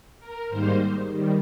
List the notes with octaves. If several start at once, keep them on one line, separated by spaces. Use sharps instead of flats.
A#4
G#2 D#3 G3 A#3 D#4 C5
D#3 G3